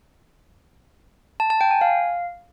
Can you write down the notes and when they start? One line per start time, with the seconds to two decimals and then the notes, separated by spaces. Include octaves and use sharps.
1.40 A5
1.50 A5
1.61 G5
1.71 G#5
1.81 F5